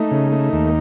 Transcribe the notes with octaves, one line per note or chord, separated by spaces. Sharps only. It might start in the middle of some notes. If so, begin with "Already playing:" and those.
Already playing: A3 D#4
C#3
A3
D#2